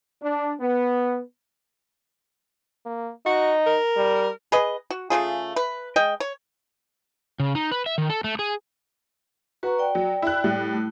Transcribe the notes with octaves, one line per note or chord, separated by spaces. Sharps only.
D4
B3
A#3
D#4 F#4
A#4
G3
G#4 B4 D#5
F#4
C#3 A3 F4 G#4
B4
G#3 D#5 G5
C#5
C#3
D#4
B4
E5
D#3
A4
A3
G#4
F#4 B4 A#5 C#6
D5 G5
F#3
E4 F#6
A2 G3
A3 E4